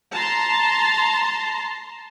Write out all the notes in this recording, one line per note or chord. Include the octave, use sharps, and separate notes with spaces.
A5 A#5 C6